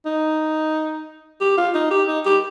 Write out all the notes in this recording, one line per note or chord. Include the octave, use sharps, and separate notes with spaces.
D#4
G4
F4
D#4
G4
D#4
G4